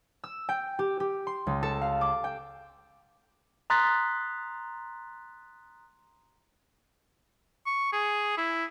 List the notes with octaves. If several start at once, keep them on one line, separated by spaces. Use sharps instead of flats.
E6
G5
G4
G4
C6
C#2
A4
F5
D6
G5
A#5 C6 D#6 F#6 A6 B6
C#6
G#4
E4